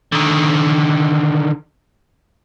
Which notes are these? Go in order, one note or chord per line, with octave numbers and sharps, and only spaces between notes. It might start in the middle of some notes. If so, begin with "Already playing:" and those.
D3 D#3